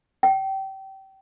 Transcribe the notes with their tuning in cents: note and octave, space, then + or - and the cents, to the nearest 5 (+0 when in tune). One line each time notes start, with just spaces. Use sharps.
G5 -30